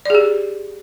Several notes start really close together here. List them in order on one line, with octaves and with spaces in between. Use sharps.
D5 G#4 G4